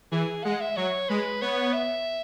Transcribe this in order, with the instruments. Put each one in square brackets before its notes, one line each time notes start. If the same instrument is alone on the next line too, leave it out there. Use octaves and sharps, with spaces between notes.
[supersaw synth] E3 [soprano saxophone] G#4
[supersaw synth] G#3 [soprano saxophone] F#5
[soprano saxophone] E5
[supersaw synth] F#3 [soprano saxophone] C#5
[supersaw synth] G#3 [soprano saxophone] B4
[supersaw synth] B3 [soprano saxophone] C#5
[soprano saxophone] E5